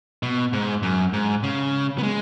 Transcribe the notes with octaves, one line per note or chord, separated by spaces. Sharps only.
B2
G#2
F#2
G#2
C#3
B3
G#3